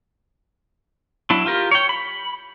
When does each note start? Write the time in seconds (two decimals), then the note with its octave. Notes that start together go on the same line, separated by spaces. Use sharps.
1.30 F#3 D4 E4
1.46 F4 G4 A#4
1.71 C#5 G5
1.89 B5